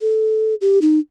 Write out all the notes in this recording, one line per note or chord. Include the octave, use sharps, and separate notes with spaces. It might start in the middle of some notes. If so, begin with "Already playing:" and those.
A4
G4
D#4